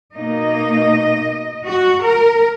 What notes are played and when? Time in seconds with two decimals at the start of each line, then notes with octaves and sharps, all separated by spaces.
0.15 B2 A#3 D#4 D#5
1.65 F#4
2.03 A#4